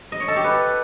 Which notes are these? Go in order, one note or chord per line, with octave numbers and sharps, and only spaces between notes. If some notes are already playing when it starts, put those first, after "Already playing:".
D#5
C#5
A4
G4
B4